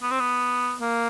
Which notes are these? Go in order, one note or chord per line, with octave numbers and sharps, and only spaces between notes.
B3
C4
B3
A#3